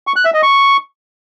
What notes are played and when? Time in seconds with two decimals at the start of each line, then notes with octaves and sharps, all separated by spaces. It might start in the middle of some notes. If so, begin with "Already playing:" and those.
0.07 C#6
0.16 F#6
0.25 E5
0.34 D#5
0.43 C#6